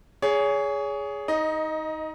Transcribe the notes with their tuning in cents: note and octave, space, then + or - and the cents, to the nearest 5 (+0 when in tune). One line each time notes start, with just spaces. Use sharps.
G#4 +0 C#5 +30
D#4 +20 D#5 +0